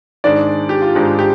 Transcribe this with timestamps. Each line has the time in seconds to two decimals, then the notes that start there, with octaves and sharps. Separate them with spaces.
0.24 G#2 D#3 G#3 D4 D5
0.69 G4
0.82 F4
0.95 G#2 D#3 G#3 D4 D#4
1.19 G4